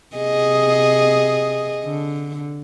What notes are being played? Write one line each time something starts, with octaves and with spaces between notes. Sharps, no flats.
C3 G#4 D#5
D3